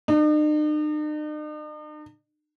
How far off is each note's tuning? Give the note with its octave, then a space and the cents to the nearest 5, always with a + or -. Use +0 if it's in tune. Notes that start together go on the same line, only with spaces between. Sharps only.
D#4 -45